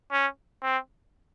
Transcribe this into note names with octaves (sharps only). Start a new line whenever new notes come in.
C#4
C4